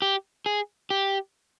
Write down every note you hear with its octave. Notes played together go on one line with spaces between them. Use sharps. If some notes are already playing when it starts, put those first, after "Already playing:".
G4
G#4
G4